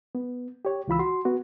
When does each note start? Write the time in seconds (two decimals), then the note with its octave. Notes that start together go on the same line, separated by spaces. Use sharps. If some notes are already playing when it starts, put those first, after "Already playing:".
0.15 B3
0.65 G4 C#5
0.88 C#2 E3 F4 B5 E6
0.99 F#4 C6
1.25 B3 F#4